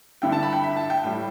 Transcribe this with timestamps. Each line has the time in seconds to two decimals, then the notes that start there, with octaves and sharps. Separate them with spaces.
0.22 G2 D3 G3 E4 G5
0.32 A5
0.43 B5
0.53 G5
0.64 E5
0.77 A5
0.90 G5
1.04 A2 G3 E4 G5